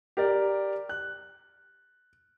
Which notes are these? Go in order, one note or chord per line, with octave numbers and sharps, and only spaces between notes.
G4 A#4 D5
F#6